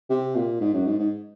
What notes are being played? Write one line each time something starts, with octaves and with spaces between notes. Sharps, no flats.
C3
A#2
G#2
F#2
G#2
G#2